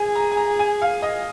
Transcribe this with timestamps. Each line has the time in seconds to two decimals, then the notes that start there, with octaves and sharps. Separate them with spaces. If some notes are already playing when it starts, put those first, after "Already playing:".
Already playing: G#4 G#5
0.15 A#5
0.31 G#5
0.37 A#5
0.59 G#5
0.82 F5
1.02 D#5